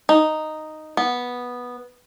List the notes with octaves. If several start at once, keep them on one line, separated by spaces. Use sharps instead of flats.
D#4
B3